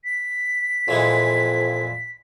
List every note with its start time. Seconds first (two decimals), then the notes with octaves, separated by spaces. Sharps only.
0.04 B6
0.88 F2 A#2 E3 G#3